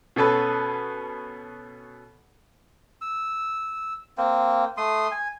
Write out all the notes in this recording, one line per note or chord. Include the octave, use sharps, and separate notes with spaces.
B2 C#4 A4 B4
E6
A#3 C4
A3 C6 D#6
G#5